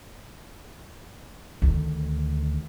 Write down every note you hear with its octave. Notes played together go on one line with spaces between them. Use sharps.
D2 D#3